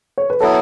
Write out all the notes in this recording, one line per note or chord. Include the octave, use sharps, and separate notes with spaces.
C#5
B4
F#3 B3 E4 A4